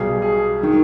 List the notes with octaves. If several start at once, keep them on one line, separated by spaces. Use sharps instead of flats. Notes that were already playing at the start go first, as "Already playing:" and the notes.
Already playing: B1 B2 G3 G#4
G#4
D#3